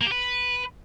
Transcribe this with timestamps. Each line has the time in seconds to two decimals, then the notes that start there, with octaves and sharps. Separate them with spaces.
0.01 A#3
0.06 G4
0.12 B4